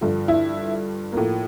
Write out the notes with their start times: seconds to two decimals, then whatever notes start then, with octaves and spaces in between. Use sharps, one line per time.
0.01 G2 D3 F3
0.28 E4
1.12 A2 F3 A#3